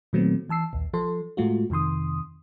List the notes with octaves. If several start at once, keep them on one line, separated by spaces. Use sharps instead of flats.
A#2 D#3 F#3 A3 B3 C4
E3 A5 E6 C7
A#1 D#2
F3 A4 C6
A2 G#3 A3 F4 F#4
F2 C3 D#3 C6 D#6